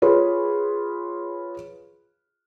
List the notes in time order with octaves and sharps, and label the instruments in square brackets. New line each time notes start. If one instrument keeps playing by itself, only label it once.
[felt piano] F4 G#4 B4 C#5